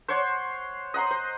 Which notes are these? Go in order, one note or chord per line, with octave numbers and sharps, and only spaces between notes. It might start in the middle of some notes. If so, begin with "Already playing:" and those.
C5 C#5 F#5 C6
D#5 F#5 A#5 C6
C5